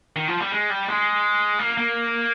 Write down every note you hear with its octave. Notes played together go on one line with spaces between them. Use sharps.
D#3
F3
G3
G#3
G3
G#3
A#3
A#3